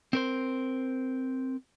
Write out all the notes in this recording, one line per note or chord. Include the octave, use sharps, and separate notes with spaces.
C4 A#4 C5